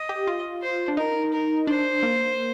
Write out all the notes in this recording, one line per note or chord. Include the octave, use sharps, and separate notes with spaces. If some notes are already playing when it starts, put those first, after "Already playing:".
Already playing: D#5
G4
F4
C5
D4
D#4 A#4
A#4
D4 C5
A#3